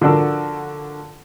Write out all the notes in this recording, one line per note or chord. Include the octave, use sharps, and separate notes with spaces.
D3 F3 D4 F#4 A4 A#4